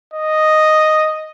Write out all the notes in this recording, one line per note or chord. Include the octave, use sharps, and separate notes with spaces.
D#5